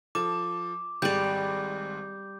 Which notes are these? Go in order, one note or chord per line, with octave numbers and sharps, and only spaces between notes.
F3 A4 D6 E7
G#1 G#2 G3 D5 G6